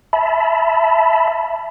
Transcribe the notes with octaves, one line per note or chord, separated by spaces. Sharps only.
E5 A5 B5